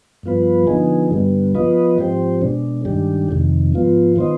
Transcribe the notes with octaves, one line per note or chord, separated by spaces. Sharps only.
G2 F3 B3 F4 B4
D3 F3 B3 D#4 G#4
G2 D3 G3 B3
F3 B3 F4 B4 D#5
G#2 F3 C4 G4 C5
B2 G#3 D4
G2 D#3 G#3 D4 G4
F2 C3 D#3
G#2 F3 B3 F4
D#3 B3 F4 C5 D#5